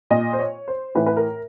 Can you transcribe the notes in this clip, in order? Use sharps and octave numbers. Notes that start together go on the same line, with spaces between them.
A#2 D#5
C5
C#5
C5
A2 E3 B4
B4
A#4